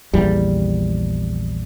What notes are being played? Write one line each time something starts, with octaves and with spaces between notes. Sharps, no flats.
A#1 E2 G3